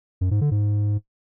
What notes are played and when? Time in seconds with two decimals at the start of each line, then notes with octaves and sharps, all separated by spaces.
0.21 F#2
0.31 G#2
0.41 D3
0.51 G#2